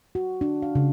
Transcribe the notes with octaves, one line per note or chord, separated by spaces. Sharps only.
F#4
D4
F5
C#3